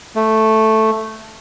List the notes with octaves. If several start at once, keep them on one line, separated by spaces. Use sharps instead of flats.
A3